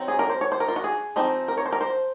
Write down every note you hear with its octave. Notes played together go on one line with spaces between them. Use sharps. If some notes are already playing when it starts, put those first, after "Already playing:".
Already playing: F#3 C4 D#4
G#4
A#4
C5
C#5
C5
A#4
F4
F#4
G#4
F3 C4 D#4
A#4
C#5
C5
A#4
C5